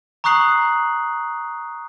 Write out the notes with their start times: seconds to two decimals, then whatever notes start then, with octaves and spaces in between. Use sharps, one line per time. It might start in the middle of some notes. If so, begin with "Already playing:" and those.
0.24 A#5 C#6 D#6 F#6 C7 F#7